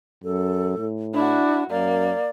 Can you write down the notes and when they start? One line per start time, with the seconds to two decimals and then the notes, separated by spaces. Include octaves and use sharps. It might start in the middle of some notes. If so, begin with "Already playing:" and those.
0.24 F#2 A4
0.78 A2
1.14 D4 E4 F#4
1.70 F#2 A#3 D5